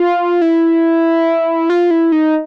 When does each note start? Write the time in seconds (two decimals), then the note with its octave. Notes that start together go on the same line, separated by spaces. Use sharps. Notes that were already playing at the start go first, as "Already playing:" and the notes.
Already playing: F4
0.41 E4
1.70 F4
1.91 E4
2.12 D#4